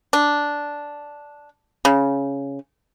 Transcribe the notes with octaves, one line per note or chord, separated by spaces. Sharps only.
D4
C#3